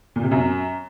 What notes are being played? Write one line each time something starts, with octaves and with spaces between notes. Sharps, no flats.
A#2
C3
F#2